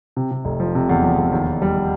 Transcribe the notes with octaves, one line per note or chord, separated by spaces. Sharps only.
C3
C3
F1
F3
C3
E2
F3
E2
D#2
D#2
G3